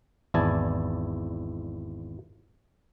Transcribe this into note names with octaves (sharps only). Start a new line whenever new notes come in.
G#1 E2 E4 D5 G#5 A5